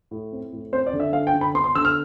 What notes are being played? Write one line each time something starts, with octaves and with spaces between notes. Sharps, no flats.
A2
C4
A2
C4 C5
D5
D3
E5
D3 F5
G5
D3
B5
B3 C6
C6
D3 E6
F6